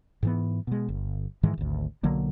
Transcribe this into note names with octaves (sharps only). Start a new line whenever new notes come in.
G#2 E3 B3
B2 G#3
G1
G#2 D#3 E3 G#3
G#1 D2
B1 D3 F#3 A#3